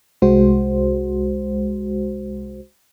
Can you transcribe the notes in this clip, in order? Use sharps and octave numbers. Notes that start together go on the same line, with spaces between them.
C2 G#3 F#4 C5